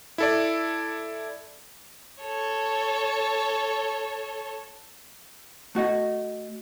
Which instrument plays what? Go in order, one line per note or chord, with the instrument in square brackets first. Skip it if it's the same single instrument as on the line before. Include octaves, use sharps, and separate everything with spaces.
[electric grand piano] E4 A4 D5
[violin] A4 C#5
[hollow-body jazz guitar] A3 F#4 D#5 F#5